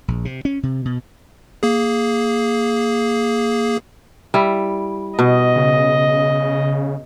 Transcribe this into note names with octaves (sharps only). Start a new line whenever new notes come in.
A#1
C3
C#4
C3
B2
A#3 G#4
G3 E4
B2 D#5
C#3